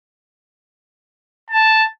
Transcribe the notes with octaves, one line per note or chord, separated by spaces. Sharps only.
A5